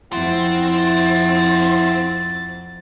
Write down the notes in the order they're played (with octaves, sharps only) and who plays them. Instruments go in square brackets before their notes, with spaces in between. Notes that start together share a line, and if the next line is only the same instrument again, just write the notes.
[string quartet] F2 A6 [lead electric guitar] C4 [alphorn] E4 [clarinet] F#5